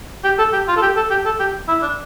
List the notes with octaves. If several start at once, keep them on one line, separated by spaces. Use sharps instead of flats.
G4
A4
G4
F4
A4
G4
A4
G4
A4
G4
E4
D4